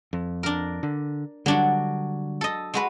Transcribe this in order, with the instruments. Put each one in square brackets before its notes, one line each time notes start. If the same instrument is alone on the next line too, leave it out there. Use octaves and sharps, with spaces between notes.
[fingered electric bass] F2
[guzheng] D4 A#4
[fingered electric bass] D3
[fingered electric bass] D3 G3 [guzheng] F#3 D4 F#4
[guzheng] A4 D#5
G#3 F#4 B4